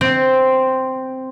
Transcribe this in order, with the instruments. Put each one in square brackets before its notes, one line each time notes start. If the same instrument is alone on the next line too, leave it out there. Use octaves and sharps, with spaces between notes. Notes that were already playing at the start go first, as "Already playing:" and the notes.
[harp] C4